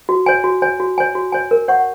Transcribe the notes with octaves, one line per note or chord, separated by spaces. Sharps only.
F#4
C#5 G#5
F#4
C#5 G#5
F#4
C#5 G#5
F#4
C#5 G#5
A#4
C#5 F#5 C#6